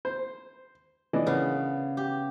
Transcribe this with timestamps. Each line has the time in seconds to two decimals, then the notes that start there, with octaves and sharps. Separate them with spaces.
0.05 C5
1.13 E3 D4 D#5
1.27 C#3 B3
1.97 G4